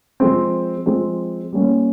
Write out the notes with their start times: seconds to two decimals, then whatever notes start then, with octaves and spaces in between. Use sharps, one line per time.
0.20 F3 G#3 C4
0.86 F3 G#3 C4
1.53 G3 A#3 C#4